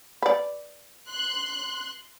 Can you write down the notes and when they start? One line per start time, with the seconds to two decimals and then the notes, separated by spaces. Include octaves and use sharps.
0.22 B4 D5
1.09 C6 F#6